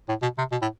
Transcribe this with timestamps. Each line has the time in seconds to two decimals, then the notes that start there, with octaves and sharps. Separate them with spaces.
0.09 A2
0.22 B2
0.38 C3
0.52 B2
0.62 A2